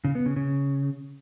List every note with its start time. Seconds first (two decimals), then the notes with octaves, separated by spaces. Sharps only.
0.05 C#3
0.15 B3
0.26 C#3
0.36 C#3